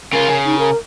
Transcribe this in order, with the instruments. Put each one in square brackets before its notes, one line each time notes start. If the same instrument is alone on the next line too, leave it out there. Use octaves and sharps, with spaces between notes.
[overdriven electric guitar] C#3 F4 [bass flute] A#4
[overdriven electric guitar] C#3
[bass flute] D#4
A#4